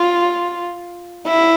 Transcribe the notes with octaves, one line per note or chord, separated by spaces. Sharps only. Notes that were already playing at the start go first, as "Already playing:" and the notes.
Already playing: F4
E4